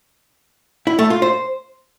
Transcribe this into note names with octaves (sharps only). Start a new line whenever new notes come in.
E4
A3
F4
C5